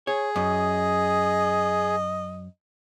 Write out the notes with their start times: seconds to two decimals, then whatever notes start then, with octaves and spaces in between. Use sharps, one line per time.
0.07 G#4 C#5
0.36 F#2 D#5